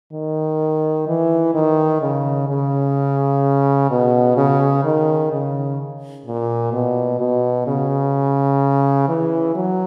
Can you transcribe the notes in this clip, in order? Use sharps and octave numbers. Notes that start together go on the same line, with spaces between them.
D#3
E3
D#3
C#3
C#3
B2
C#3
D#3
C#3
A#2
B2
B2
C#3
E3
F#3